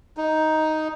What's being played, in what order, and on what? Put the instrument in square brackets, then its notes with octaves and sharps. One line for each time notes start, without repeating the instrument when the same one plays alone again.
[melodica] D#4